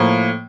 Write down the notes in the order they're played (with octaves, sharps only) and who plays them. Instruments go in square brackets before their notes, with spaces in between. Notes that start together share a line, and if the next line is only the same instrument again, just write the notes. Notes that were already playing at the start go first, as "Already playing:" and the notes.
Already playing: [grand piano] A2 F3 A#3